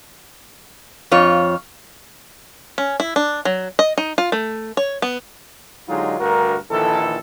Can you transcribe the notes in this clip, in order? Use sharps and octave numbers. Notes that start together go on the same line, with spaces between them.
F2 F4 C#5
C#4
E4
D4
F#3
D#5
D#4
F4
A3
C#5
B3
D3 F#3 G#3 D#4 F4 G4
D2 G2 F#4 A#4
A#1 D#3 E3 A4